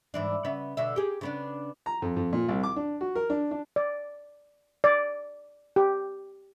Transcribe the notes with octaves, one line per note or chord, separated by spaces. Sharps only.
G#2 E3 D4
C#3 B3 E5
B2 D3 E5
G4 G#4
C#3 B3 D4
A#5
F2
F2
A#2
C2
D6
D4
F#4
A#4
D4
D4
D5
D5
G4